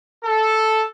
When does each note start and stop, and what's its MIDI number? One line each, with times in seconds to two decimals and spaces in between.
0.25 0.83 69